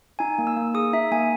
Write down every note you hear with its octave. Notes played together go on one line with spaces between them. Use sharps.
D#4 G#5
A#3
E6
A#3
G#4 D#6
D#4 E5
A#3 G#5